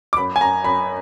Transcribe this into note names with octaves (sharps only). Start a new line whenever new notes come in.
D6
F#2 B5
G#5
F#2 A#5
F#2 B5